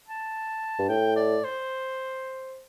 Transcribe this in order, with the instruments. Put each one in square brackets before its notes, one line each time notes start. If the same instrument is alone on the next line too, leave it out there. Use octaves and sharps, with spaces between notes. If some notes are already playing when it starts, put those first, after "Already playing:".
[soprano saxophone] A5
[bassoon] G2
[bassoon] A2 [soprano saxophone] G5
[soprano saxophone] D5
C5